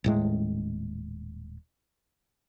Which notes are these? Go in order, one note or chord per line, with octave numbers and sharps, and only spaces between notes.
D#1 A2 G#3